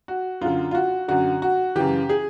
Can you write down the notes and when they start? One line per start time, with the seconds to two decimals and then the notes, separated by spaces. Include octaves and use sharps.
0.08 F#4
0.41 F#2 D3 F4
0.71 F4
0.75 F#4
1.08 F#2 D3 F#4
1.42 F#4
1.76 F#2 C#3 E3 G4
2.09 G#4